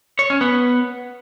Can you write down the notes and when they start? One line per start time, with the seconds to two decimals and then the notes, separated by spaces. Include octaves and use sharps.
0.19 C#5
0.30 C#4
0.41 B3